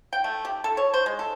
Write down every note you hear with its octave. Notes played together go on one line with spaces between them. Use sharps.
G5
A3
G4
A4
C#5
C5
G#3
A4